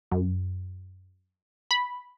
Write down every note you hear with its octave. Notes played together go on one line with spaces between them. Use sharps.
F#2
B5